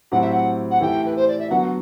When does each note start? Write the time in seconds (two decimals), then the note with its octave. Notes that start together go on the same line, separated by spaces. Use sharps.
0.11 A2 F#3 C4 E4 G4 F#5
0.21 E5
0.31 F#5
0.70 F#5
0.81 E3 A3 E4 G4 G5
1.05 B4
1.16 C5
1.27 D5
1.38 E5
1.49 D3 F#3 B3 F#4 F#5